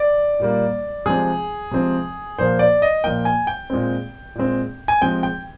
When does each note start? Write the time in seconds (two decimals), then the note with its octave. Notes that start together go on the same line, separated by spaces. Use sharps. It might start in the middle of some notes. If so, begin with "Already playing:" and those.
Already playing: D5
0.40 A#2 G3 A#3
1.06 C3 F3 G#3 C4 G#4
1.71 C3 F3 G#3 C4
2.38 A#2 F3 A#3 C5
2.59 D5
2.82 D#5
3.04 A#2 F3 A#3 G5
3.25 G#5
3.47 G5
3.70 A#2 G#3 C4
4.35 A#2 G#3 C4
4.88 G#5
5.01 C3 F3 G#3 C4 G5
5.23 G5